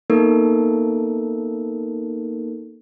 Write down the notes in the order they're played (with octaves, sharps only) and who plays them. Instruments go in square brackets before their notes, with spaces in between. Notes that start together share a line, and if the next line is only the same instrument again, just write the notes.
[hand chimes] A#3 B3 D#4 A4 A#4